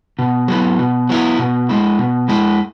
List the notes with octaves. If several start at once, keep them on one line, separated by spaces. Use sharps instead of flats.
B2
F#3 B3 E4
B2
F#3 B3 E4
B2
G#3 E4
B2
G#3 E4